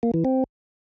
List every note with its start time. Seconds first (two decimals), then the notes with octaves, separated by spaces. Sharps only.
0.03 A#3
0.14 E3
0.25 C4